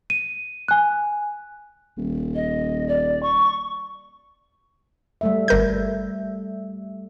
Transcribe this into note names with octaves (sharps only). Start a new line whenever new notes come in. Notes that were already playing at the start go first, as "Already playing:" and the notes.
D#7
G#5 F#6
D#1
D#5
D5
C#6
G3 A3 E5
G1 G3 A#4 G6